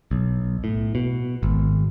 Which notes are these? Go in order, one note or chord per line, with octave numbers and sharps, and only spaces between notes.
B1
A2
B2
G#1